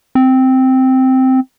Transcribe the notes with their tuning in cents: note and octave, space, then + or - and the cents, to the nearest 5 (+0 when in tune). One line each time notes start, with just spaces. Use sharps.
C4 -5